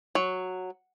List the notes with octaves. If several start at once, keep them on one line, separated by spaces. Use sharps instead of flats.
F#3